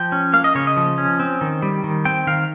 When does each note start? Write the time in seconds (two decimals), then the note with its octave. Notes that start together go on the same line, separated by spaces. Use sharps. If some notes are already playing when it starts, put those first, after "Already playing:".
Already playing: F3 G5
0.12 C#4
0.33 A#3 F5
0.44 D#5
0.55 C#3 C#5
0.67 D#5
0.77 F3
0.98 C#4
1.20 C4
1.41 D#3
1.62 G3
1.84 D#3
2.05 C4 G5
2.27 D#3 F5